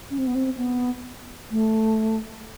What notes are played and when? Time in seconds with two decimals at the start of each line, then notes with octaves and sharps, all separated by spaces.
0.10 C#4
0.18 C4
0.27 B3
0.35 C4
0.57 B3
1.51 A3